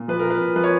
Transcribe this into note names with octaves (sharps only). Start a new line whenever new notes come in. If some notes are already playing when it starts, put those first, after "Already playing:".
Already playing: A#2
F3 B4
A#2 A#4
B4
A#2
F3 B4
C#5